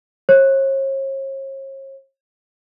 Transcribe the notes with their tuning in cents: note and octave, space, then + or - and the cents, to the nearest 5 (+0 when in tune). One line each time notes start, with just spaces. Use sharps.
C#5 -45